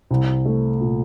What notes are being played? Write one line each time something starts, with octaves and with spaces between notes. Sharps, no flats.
C2
A3
A#2